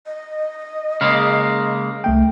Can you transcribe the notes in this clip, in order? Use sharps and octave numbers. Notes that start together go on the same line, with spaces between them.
D#5
C#3 G#3 A#3 F6
C2 A3 G5